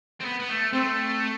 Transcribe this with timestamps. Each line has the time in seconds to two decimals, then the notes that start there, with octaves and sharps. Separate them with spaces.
0.21 C4
0.25 B3
0.40 B3
0.49 A3
0.73 A3 C4